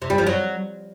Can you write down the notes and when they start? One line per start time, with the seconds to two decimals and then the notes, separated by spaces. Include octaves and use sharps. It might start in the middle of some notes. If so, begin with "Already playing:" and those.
0.02 C3
0.10 G3
0.18 F3
0.27 F#3